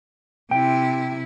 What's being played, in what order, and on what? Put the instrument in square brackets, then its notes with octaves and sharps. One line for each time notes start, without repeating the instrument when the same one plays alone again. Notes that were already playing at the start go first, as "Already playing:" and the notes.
[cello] C3 E4 [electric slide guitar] G5